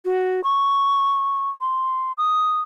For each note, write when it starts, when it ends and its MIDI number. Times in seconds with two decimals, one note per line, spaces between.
0.05 0.41 66
0.44 1.50 85
1.61 2.12 84
2.18 2.61 87